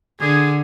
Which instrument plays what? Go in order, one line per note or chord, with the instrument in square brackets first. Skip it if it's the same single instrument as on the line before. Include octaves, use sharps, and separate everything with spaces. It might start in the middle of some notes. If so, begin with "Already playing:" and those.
[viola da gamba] D3 [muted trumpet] G#4